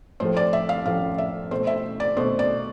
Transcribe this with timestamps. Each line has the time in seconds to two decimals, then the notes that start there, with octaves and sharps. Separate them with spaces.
0.20 A2 F3 A3 C5
0.37 D5
0.53 E5
0.69 F5
0.85 A2 F3 A3 F5
1.18 E5
1.51 B2 A3 C5
1.67 E5
2.00 D5
2.17 B2 A3 C5
2.39 D5